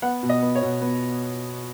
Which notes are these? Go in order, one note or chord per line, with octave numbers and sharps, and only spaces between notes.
B3 F#5
B2
D#5
B3
C#5
B2
B3